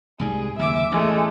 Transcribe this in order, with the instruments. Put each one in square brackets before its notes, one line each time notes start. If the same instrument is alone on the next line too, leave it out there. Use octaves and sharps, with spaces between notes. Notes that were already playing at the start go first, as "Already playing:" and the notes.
[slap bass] C2 G#2 G3 [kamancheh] G#4
[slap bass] F#1 D#2 [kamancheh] E5 D6
[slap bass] A1 E2 [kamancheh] G#3 A3